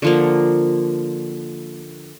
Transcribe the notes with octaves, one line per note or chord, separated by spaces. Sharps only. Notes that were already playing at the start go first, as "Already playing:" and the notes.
D3 F3 A#3